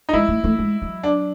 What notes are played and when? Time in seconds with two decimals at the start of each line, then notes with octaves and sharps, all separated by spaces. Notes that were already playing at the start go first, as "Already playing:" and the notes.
0.09 D#4
0.13 G#3 E4
0.28 A3
0.44 A3
0.59 G#3
0.82 F#3
1.03 D4